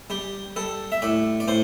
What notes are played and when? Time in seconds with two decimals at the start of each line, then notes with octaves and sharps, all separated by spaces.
0.10 G3 G4
0.56 G3 A4
0.92 E5
1.02 A2 D5
1.40 D5
1.48 A2 C5